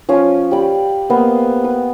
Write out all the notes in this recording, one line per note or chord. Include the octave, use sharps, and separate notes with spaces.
F3 C#4 F5
G4 D5 B5
A#3 B3 C5 D#5
B4